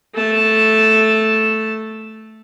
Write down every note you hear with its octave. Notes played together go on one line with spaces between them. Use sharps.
A3 A5